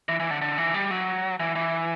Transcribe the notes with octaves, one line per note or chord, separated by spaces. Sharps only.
E3
E3
D3
D3
E3
G3
F#3
E3
E3